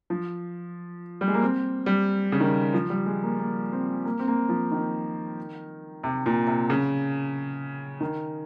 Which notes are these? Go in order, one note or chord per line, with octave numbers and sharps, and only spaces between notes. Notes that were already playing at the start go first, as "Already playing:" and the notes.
F3
G3
G#3
A#3
C4
G3
C#3
D#3
F3
G3
G#3
A#3
A#3
C4
A#3
C4
A#3
F3
D#3
C3
A#2
C3
C#3
D#3